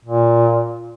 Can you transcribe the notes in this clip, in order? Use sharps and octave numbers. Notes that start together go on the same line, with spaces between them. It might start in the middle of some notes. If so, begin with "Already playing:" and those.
A#2